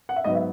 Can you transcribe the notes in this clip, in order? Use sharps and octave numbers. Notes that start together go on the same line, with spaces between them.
F#5
E5
G#2 F#3 B3 D#5
E5